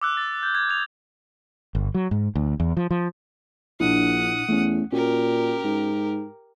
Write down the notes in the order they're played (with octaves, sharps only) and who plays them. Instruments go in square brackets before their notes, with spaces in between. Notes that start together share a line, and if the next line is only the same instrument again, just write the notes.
[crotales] D6 E6 F#6
A6
G6
G#6
D#6 G#6 F7
[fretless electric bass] G1
F#3
G#2
D2
E2
F3
F3
[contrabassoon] A#1 [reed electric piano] A#2 D4 E4 [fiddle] F#5 D#6
[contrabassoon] E2 [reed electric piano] A3 C#4
[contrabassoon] A#2 [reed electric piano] C#4 F#4 [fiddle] G4 A#4
[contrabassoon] G#2